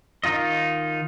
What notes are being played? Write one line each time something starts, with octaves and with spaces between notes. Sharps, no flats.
D#3 D#4 F4 D#5